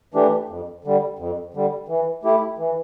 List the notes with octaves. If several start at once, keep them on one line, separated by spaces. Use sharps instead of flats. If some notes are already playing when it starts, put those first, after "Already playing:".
E3 A3 D4 G4
F2
D3 G3
F2
D3 G3
E3
A3 E4 G4
E3